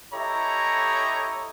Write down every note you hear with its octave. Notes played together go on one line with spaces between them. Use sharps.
E4 G4 A4 C#5 D#5 A#5